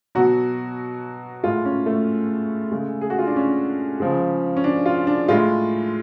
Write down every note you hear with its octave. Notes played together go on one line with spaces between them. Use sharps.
B2 F#3 F#4
A2 G#3 F4
C#4
A3
C#3 G#3
G#4
F#4
F4
D4
C#4
C#3 F3 G#3
C#4
D4
F4
D4
A2 G#3 F4